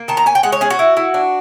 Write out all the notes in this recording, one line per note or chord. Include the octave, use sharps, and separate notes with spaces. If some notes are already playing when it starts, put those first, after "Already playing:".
Already playing: A#3
D#3 A5
A#5
C#4 G#5
G5
G#3 F#5
C#5
C#4 G#4
F#4
E4
E4
D4